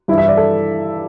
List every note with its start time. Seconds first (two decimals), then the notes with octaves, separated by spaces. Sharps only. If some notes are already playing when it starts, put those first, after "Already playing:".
0.08 G2 E4
0.13 E3 E5
0.28 D5
0.37 A4